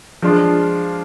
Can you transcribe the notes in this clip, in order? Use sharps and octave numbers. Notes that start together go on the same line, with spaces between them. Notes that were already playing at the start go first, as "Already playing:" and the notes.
F3 G#3 D4 F4